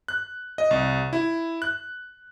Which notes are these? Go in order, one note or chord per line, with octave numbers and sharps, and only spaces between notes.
F#6
D#5
C2
E4
F#6